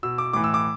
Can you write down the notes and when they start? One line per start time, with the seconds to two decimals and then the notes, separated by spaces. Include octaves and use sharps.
0.03 B2 E6
0.18 D6
0.33 A2 E3 D6
0.44 E6
0.54 D6